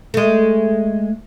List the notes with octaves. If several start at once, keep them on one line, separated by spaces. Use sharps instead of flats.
G#3 A3